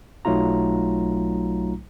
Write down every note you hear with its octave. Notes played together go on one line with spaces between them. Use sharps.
B1 F#3 A3 D#4 F4 A#5